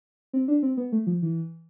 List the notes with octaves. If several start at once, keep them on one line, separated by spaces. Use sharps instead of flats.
C4
D4
C4
B3
A3
F3
E3